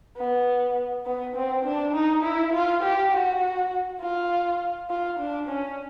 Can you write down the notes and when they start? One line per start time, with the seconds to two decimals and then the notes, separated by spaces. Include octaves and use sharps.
0.17 B3
1.06 B3
1.36 C4
1.65 D4
1.94 D#4
2.23 E4
2.53 F4
2.83 G4
3.13 F#4
4.01 F4
4.90 F4
5.19 D4
5.48 C#4